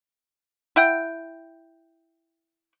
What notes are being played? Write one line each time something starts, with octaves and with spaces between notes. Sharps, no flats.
E4 F#5 G5